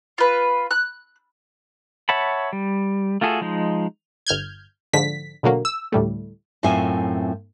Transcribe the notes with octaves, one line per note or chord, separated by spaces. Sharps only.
F4 B4
F#6
C#5 E5 F#5 A5 B5
G3
A3 F4 F#4 G#4 A4
F3 G#3 D#4
G1 F6 G6 G#6
G#2 D3 F3 B6
B2 D3 F#3 A#3
E6
D2 A2 G3 A3
F#2 A2 C4 F4 E5 G#5